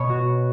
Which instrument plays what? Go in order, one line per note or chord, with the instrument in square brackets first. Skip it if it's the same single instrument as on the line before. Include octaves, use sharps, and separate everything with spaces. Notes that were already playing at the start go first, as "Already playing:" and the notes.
Already playing: [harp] B2 B3 C#5
F#4